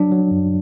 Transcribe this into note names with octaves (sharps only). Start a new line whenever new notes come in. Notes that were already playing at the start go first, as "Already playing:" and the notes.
Already playing: F#3 D4
F#3
F#2